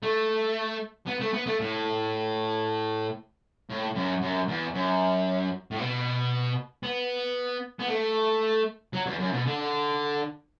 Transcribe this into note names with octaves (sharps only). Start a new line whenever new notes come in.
A3
B3
A3
B3
A3
A2
A2
F#2
F#2
E2
F#2
A2
B2
B3
B3
A3
F#3
E2
F#2
B2
D3